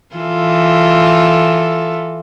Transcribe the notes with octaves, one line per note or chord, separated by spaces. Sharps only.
E3 F4 A4